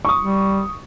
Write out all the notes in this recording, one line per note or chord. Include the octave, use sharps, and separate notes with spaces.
C#6 D#6
G3